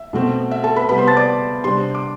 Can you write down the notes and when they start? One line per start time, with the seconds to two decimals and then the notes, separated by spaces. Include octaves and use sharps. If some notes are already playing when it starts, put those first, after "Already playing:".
Already playing: E5
0.13 B2 A3 C4
0.51 E5
0.63 A4 A5
0.76 B4 B5
0.88 C3 G3 B3 B4 B5
0.98 C5 C6
1.07 A5 A6
1.17 D5 D6
1.64 C3 G3 D4 C5 C6
1.95 D6